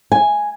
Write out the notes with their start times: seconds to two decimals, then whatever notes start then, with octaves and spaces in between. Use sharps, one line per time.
0.12 G#5